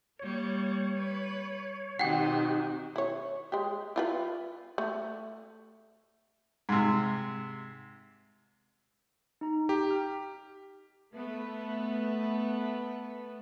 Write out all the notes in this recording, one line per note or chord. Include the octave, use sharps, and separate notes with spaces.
G3 A#3 C#5
B4
B2 D#3 C4 D#4 F#4 G4 F#5 G5
E4 C#5
G#3 G4
E4 F4 B4
A3
G#2 C3
D#4 A#5
G4
F6
A3 B3 B4